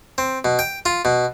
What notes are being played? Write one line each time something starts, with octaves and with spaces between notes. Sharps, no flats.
C4
B2
G5
F4
B2